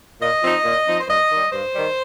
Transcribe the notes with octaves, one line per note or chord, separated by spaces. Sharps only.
A#2 D#5
F3 C4 D#4
A#2
F3 C4 D#4
C5
G2 D#5
D#3 G3
G2 C5
D#3 G3